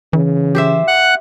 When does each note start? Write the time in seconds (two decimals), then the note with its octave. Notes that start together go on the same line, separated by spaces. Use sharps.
0.13 C#3 E3
0.55 G4 C5 E5
0.88 F#5 F#6